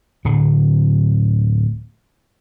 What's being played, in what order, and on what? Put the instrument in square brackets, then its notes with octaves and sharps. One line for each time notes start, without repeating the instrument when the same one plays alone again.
[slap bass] D1 D3